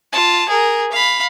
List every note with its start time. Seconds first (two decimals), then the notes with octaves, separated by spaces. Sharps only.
0.13 F4 A5
0.49 G#4 A#4
0.92 F5 B5